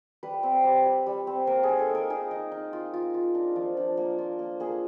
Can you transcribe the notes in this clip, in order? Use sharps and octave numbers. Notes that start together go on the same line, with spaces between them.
G3 B4
C4
G3
G3
G3
C4
A#3 A#4
G#4
D#4
A4
A#3
A#4
D#4 G#4
D#4
D#4
F4
F4
F4
D4
F3
D4
A#3
F4
A#3
A#3 G#4